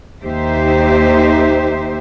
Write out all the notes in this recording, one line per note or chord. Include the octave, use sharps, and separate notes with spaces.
D#2 D#4 G4 C5 E5